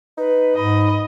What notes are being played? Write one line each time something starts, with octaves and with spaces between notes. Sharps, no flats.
D#4 B4
G#2 D#5 B5